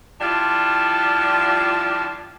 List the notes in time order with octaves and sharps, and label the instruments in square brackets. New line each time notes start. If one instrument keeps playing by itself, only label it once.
[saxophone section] F3 G3 D4 E4 F4